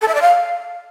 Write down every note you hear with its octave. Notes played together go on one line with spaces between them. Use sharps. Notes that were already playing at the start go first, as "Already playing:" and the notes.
A4
E5
D5
F5